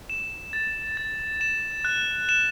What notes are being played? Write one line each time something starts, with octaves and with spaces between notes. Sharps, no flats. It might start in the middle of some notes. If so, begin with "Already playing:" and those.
E7
A6
A6
E7
F#6
E7